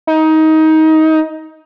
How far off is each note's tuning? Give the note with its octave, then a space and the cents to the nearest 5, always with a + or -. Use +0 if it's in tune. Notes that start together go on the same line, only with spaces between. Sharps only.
D#4 +20